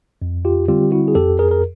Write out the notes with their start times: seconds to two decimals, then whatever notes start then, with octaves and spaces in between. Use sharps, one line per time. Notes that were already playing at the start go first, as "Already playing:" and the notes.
0.22 F2
0.45 F4 G4
0.68 D3 G3 C4 F4 G4
0.92 E4 F#4
1.08 G#4
1.15 F2 G4 A4
1.39 G#4 A#4
1.51 A#4